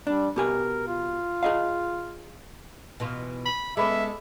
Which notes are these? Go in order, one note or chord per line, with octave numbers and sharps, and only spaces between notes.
G3 D4
B2 G4 A#4 G#5
F4
G#4 D#5 F5
B2 E3 F4
B5
G#3 B3 C#4 G#4 A4 E5 B5 D6